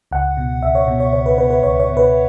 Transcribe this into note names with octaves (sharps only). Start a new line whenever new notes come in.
C#2 F#5
B2
C#2 E5
C#5
B2
C#5
C#2 C#5
B4
B2 B4
B4
C#2 C#5
C#5
B2
B4